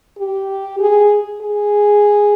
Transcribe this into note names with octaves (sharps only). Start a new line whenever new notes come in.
G4
G#4
G#4